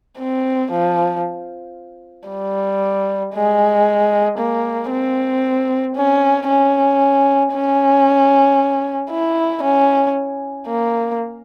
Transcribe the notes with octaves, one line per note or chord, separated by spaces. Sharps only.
C4
F3
G3
G#3
A#3
C4
C#4
C#4
C#4
E4
C#4
A#3